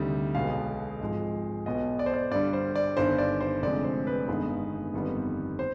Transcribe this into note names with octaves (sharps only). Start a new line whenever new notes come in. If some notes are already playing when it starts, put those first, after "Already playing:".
Already playing: D2 C3 D#3 G3
B1 B2 G#3 B3 F5
G#1 G#2 F3 G#3
B1 B2 B3 D#5
D5
C5
D5
G2 D3 G3 D5
C5
D5
G1 G2 D#3 C5
D5
C5
F1 F2 D3 G#3 D5
C5
B4
G1 G2 D#3 G#3 B3
G1 F2 D#3 G3 B3
C5